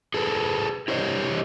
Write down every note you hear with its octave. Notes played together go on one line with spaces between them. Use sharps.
G#4 A4 B4
E4 G4 C5 C#5 D#5